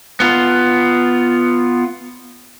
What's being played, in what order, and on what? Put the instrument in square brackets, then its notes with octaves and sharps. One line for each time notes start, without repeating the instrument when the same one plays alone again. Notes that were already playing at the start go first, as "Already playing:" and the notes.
[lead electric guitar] B3 F4